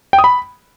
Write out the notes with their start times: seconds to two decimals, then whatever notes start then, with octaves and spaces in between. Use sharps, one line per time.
0.13 G5
0.19 D#6
0.24 B5